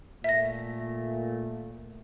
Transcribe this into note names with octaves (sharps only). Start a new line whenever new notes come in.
A#2 A3 E5 A#6